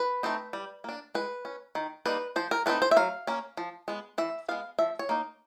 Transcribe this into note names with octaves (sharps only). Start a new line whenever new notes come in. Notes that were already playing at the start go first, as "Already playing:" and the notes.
Already playing: B4
A3 C4 D#4
G3
A#3 D4
G#3 B4
C#4
D#3
G3 A#3 D#4 B4
F3 C5
A#4
A3 C4 D#4 B4
C5
E5
F#3 F5
A#3 C#4
F3
G#3 B3
E3 E5
G#3 B3 F5
F3 E5
C#5
A#3 D#4